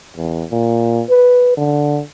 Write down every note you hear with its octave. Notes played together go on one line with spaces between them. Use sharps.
E2
A#2
B4
D3